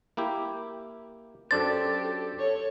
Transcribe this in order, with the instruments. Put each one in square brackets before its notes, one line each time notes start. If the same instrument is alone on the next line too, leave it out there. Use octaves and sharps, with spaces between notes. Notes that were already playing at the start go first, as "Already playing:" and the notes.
[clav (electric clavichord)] A#3 E4 G4
[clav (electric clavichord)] F#2 D4 C5 [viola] G4 A4 [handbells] A6
[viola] A4 C#5